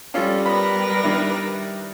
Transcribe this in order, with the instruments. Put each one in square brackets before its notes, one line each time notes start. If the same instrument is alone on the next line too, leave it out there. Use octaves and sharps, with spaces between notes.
[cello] G3 [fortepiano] C#4 F4 A4
[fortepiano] B3 B5 [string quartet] A#4 B4 A#6
[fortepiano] D#3 D4 E4